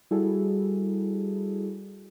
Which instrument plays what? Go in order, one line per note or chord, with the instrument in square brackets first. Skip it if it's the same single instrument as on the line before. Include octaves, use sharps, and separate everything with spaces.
[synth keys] G3 E4 F#4 G#4 A4